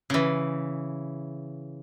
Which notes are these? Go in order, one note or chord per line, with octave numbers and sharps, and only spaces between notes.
C#3 E3